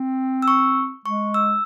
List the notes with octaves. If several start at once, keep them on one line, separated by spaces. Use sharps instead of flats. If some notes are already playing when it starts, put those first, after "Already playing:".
Already playing: C4
E6
C#6
G#3 C#6
E6